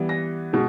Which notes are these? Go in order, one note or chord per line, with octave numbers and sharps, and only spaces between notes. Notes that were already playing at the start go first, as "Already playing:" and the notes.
Already playing: E3 G3 B3
A#6
B2 G#3